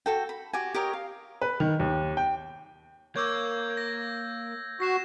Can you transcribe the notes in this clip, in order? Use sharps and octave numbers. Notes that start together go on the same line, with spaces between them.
F#4 A4 G5
B5
F#4 G4 G#5
G4 A#4 C#5 D#5
F5
B4
D#3
D#2
G5
A#3 C#5 C#6 D6 E6 G6 G#6
A#6
F#4 A#6 C7 E7